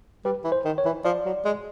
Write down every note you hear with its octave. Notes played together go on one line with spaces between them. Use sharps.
G3 B4
E3
C5
D#3
C#5
E3
F3 D5
F#3
G#3